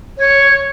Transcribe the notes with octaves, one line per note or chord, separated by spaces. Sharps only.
C#5